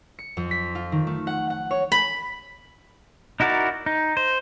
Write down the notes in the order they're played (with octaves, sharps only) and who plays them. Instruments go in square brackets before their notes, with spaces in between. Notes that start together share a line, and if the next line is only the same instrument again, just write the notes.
[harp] C#7
F2
B6
F4
D#3
A3
F#5
F#5
C#5
[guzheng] B5
[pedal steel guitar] D#4 E4 F#4 A#4 D5
D#4
C5